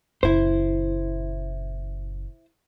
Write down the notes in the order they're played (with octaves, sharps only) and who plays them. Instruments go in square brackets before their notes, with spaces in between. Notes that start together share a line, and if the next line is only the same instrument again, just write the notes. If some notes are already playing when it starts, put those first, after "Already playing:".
[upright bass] F#1 A#2 [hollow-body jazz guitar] E4 C5